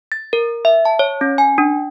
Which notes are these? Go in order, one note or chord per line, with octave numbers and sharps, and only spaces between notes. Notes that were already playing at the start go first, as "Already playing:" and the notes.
A6
A#4
E5
A5
C#5
C#4
G#5
D4